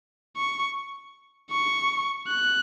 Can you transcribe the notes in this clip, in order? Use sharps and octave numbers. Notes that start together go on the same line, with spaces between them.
C#6
C#6
F#6